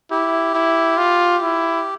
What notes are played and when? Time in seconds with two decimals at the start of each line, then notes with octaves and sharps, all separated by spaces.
0.11 E4 G4
0.55 E4
0.98 F4
1.42 E4